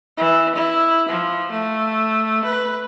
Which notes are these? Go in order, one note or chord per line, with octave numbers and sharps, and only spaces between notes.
E3
E4
F3
A3
B4